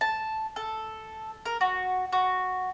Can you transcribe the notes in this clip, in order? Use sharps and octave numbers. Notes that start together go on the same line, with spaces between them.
A5
A4
A#4
F#4
F#4